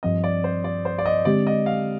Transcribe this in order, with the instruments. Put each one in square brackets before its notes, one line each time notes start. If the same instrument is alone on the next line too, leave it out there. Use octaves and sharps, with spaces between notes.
[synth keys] G2 F3 C4 [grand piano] D#5
[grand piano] D5
C5
D5
C5
D5
D#5
[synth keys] D3 G#3 C4 G4 [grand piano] D5
[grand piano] D#5
F5